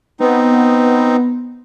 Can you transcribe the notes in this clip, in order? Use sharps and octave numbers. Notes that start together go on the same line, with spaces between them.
B3 C4 D#4